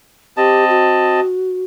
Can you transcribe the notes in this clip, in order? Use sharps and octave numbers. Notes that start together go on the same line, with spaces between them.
C4 G4 D#5 A5
F#4